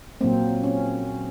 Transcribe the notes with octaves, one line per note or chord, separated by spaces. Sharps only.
A#2 F#3 A#3 C4
C#4